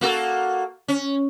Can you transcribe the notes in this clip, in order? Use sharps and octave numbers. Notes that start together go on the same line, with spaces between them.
A#3 F#4 A4
C#4